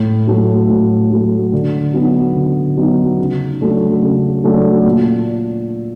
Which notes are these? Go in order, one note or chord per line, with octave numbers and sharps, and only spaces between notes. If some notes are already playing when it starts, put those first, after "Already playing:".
Already playing: A2
F#3 A3
A2
F#3 A3
D3
F#3 B3 D#4
D3
F#3 B3 D#4
C#3
F#3 A3 D4
C#3
F#3 A3 D4
A#2